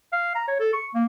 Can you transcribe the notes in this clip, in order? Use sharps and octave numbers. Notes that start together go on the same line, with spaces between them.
F5
A#5
C#5
A4
C#6
A#3